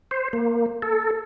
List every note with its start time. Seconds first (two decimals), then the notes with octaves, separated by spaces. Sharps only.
0.11 C5
0.33 A#3
0.82 A4